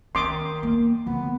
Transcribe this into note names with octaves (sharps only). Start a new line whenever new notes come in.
D#3 C#4 C6 D6 D#6
A#3
D2 F3 B3